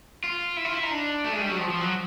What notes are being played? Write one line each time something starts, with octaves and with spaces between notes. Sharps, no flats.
F4
E4
F4
E4
D#4
D4
A3
G#3
G3
F#3
F3
F3
F#3